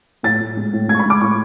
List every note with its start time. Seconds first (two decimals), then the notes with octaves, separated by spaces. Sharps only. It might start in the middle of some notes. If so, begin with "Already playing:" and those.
0.23 A2 A6
0.40 A2
0.57 G#3
0.73 A2
0.88 G#3 G#6
0.95 C#6
0.99 B5
1.06 G#3 D6
1.21 A2 C#6